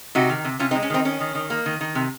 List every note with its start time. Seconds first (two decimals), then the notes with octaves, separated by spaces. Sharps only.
0.15 C3 D#4 F#4
0.29 D#3
0.45 C3
0.59 C3 C#4 F4
0.71 C4 D#4
0.75 G#3
0.83 C#4
0.90 D#3 C4 D#4
1.05 D#3 C#4
1.20 D#3
1.35 D#3
1.50 A#3
1.66 D#3
1.81 D#3
1.95 C3